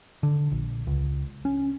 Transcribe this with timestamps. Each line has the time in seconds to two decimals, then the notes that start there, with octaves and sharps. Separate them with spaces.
0.23 D3
0.52 A#1
0.87 C#2
1.45 C#4